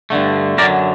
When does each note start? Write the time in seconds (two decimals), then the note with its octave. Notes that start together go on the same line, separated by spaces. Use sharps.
0.10 G2 D3 A3
0.58 F#2 D3 F#3 A#4 D5